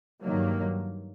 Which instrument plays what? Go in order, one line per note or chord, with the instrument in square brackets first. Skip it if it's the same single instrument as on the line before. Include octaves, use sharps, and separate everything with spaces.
[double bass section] G2 D#3 F#3 A#3